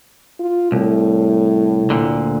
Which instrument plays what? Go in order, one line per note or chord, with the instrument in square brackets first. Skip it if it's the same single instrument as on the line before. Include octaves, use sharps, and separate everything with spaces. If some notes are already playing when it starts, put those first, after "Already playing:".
[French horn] F4
[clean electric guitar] C2 [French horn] A2
[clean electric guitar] D2 A#2 D3